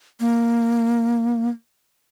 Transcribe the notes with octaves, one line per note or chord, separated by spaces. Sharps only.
A#3